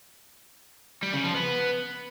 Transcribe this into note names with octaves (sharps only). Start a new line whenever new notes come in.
G3
C#3
F3
B3